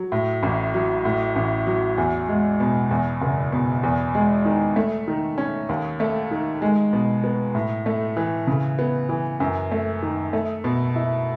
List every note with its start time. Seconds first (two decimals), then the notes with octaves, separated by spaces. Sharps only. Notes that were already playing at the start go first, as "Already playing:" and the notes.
Already playing: F#3
0.12 A2
0.43 A1
0.74 F#3
1.05 A2
1.36 A1
1.67 F#3
1.98 E2
2.29 G#3
2.60 B2
2.91 E2
3.22 F#1
3.52 B2
3.83 E2
4.15 G#3
4.45 D#3
4.76 A3
5.08 D#3
5.38 C#4
5.69 D#2
6.00 A3
6.31 D#3
6.62 G#3
6.93 B2
7.24 B3
7.55 A2
7.86 A3
8.17 E3
8.47 C#3
8.79 B3
9.09 E3
9.40 F#2
9.72 A3
10.02 D#3
10.33 A3
10.64 B2
10.96 E4